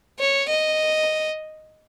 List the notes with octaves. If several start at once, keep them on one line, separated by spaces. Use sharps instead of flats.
C#5
D#5